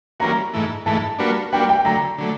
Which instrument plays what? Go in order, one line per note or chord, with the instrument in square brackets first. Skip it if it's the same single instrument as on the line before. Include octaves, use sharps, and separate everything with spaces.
[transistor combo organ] E3 G3 A#3 C#4 F#4 [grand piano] A#5
[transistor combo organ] G#2 E3 A3
[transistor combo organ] G#2 E3 A3 [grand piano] A5
[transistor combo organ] G3 A#3 D4 F#4 B4
[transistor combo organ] G3 A#3 D4 F#4 B4 [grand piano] G5
[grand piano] G5
[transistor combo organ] D3 F#3 A3 [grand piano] A#5
[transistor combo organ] D3 F#3 A3